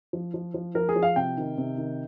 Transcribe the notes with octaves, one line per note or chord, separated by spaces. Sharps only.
F3
F3
F3
F3 A#4
G#4
F3
F5
C3 G5
D#3
C3
D#3